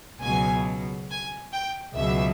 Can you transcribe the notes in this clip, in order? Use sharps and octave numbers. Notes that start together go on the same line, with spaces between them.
C#2 B2 F#3 G#5
G#5
G5
C#2 B2 F#3 E5